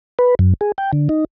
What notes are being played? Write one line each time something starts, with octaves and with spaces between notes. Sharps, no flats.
B4
F#2
G#4
G5
D3
D#4